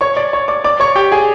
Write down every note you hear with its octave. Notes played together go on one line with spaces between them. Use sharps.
C#5 C#6
D5 D6
C#5 C#6
D5 D6
D5 D6
C#5 C#6
G4 G5
G#4 G#5